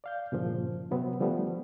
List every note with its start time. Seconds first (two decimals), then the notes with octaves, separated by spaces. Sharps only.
0.04 D5 F5 G6
0.32 G2 A#2 C#3 F3
0.91 C3 F#3 B3 C4
1.20 D3 F3 G3 A3 B3